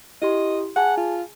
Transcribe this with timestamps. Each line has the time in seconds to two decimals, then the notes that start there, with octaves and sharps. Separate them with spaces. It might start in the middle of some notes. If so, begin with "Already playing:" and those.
0.22 E4 G4 D#5 C6
0.76 G#4 F#5 G#5 A5
0.97 F4